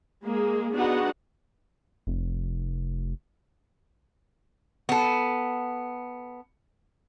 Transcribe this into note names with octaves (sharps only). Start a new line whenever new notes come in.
G#3 A#3 G#4
B3 D4 D#4 F#4 G#4 F#5
F1
B3 A4